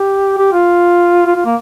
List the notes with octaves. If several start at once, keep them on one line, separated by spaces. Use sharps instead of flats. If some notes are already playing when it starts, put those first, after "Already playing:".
Already playing: G4
G4
F4
F4
F4
A#3